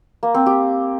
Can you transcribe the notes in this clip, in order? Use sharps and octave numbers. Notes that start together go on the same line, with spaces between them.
A#3
C4
G4